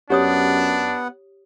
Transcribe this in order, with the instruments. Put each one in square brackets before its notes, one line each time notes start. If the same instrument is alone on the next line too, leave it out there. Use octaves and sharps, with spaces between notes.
[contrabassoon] F#2 [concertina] B3 F#5 [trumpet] D4 [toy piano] G4 C#5 D#6